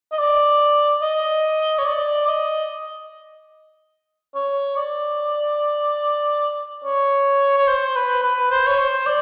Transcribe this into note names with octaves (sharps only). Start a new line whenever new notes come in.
D#5
D5
D#5
C#5
D5
D#5
C#5
D5
C#5
C#5
C5
B4
B4
C5
C#5
C5
D5